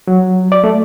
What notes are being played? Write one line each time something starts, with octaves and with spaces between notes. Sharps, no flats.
F#3
D5
A3